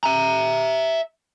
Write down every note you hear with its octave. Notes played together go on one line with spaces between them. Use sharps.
E5 A#5